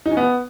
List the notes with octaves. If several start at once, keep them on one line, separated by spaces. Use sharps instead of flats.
D#4
C#4
B3